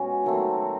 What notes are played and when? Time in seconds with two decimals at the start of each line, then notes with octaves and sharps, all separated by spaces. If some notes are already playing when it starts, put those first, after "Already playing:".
Already playing: B2 G#3 C#4 F#4
0.24 D#3 F#3 A3 C4